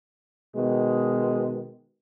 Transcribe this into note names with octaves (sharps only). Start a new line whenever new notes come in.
B2 D#3 G#3